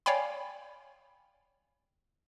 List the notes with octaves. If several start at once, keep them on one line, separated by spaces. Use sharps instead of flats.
C#5 D5 F5 G5 G#5 B5